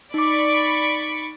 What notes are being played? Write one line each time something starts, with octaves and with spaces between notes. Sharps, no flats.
D#4 D5 B5 C#6 D6